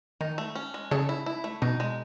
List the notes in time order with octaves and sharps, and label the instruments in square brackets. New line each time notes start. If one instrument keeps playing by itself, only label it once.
[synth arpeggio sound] D#3 [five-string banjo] D#4
[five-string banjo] A3
C#4
G#3
[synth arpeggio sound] C#3 [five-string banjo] A4
[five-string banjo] E4
E4
A3
[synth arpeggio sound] B2 [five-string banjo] D#4
[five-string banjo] G#3